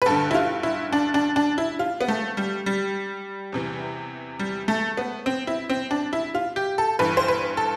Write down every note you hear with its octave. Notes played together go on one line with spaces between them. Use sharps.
B4
G2 D3 A4
E4
F4
E4
D4
D4
D4
E4
F4
B3
A3
G3
G3
E2 C3 E3
G3
A3
B3
C4
E4
C4
D4
E4
F4
G4
A4
G2 E3 B4
C5
B4
A4